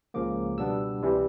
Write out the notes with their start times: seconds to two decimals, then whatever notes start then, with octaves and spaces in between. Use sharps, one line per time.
0.14 C#2 C#3 F3 A#3 D6
0.57 B2 G3 B3 D4 E6
1.02 C2 C3 E3 G3